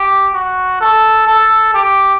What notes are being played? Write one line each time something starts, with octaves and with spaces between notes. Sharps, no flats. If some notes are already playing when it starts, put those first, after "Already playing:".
Already playing: G4
F#4
A4
A4
G4